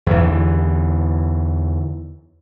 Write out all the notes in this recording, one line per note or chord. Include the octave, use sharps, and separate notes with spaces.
E2 D3 E3